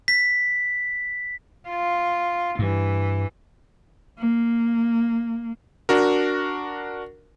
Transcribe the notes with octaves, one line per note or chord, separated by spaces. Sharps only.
B6
F4
G2 E3
A#3
D4 F#4 A#4